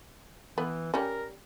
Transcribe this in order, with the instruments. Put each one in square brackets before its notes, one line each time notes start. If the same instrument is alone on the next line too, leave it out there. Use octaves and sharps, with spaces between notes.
[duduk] E3 [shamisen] B3
[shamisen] G3 C#4 [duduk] A#4